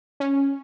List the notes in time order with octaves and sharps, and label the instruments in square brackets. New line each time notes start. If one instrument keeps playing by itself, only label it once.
[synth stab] C#4